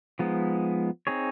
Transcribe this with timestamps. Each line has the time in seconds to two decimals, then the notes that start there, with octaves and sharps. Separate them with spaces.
0.19 F3 G#3 B3 D#4
1.07 C4 D#4 G#4 C#5